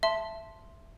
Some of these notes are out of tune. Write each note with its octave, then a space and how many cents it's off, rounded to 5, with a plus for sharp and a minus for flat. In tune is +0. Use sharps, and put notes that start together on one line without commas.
E5 +10 A5 +0 C6 +0